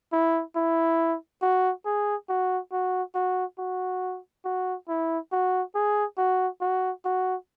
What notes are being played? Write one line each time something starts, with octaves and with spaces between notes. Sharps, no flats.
E4
E4
F#4
G#4
F#4
F#4
F#4
F#4
F#4
E4
F#4
G#4
F#4
F#4
F#4